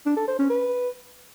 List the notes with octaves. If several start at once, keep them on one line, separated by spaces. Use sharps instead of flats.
D4
A4
C5
C#4
B4